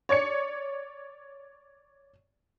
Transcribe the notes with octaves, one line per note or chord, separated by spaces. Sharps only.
C#5 D5 G#6 C#7